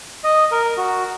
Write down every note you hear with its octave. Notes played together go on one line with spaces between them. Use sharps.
D#5
A#4
F#4